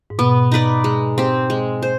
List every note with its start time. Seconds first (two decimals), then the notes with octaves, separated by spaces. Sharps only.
0.10 G#2
0.19 B2 B3
0.52 D#4 B4 D5
0.84 G#3
1.18 C4 G4
1.50 G#3
1.82 C5